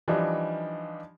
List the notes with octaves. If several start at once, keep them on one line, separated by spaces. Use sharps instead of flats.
E3 F3 G3 D4 D#4